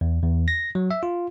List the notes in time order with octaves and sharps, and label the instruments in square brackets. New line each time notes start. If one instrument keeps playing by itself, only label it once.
[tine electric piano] E2
E2
A#6
F#3
E5
F4